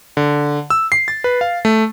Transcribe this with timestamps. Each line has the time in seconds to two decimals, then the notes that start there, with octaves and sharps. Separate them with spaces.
0.17 D3
0.70 E6
0.92 C7
1.08 A6
1.24 B4
1.41 F5
1.65 A3